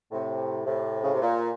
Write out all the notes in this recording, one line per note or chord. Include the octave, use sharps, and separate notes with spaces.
A2 C3
A2 C3
C#3
C3
A#2